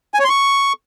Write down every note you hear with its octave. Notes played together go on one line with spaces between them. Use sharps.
G#5
C#5
C6
C#6